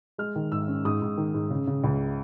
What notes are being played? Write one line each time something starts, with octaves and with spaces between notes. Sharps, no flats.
G#3 F6
D#3
G#2 E6
C#4
G#2 D#6
G#2
D#3
G#2
C#3
C#3
C#2